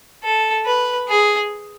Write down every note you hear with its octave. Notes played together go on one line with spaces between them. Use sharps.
A4
B4
G#4